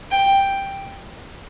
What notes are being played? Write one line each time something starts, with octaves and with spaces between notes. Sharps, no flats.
G5